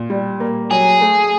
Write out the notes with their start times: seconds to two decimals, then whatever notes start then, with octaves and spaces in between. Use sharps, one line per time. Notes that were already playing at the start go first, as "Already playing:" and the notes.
Already playing: A#2
0.10 G3
0.40 A#3
0.71 F#3 G#4
1.01 A3